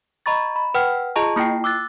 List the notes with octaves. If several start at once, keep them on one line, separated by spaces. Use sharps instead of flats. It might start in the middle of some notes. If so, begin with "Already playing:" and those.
D#5 A#5 B5 C#6 A6
B5
B4 F#5 G5 F6
F4 G#4 D#5 A5 A#5 C#6
A#3 E4 F4 G5 C7
D6 E6 F#6 A6